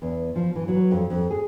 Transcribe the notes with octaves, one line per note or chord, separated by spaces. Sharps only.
E2
F3
E3
F#3
F2
F2
G#4